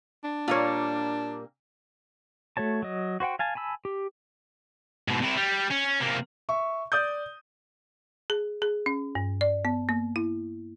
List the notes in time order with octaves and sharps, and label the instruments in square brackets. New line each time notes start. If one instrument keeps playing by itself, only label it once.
[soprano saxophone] D4
[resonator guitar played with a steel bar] A#2 G3 A#3 [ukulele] F4 C#5
[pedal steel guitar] A3 F#4 C#5 A5
F#3 D#5
F#4 C5 F#5 G5
F5 G#5 A5
G#5 A5 B5 E6
G4
[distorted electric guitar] G#2 B2
C3 E4
G3
C#4
C3 A#3
[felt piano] E5 C#6
D5 D#6 G6
[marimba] G#4
G#4
C#4
G2
D5
B3
A#3
E4